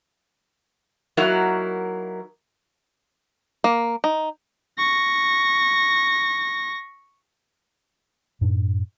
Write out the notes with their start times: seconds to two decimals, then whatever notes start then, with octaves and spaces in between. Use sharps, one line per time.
1.17 F#3 A#3 D#4 E4 F#4 A#4
3.64 A#3
4.04 D#4
4.78 C#6 A#6
8.41 F#2 A2 D4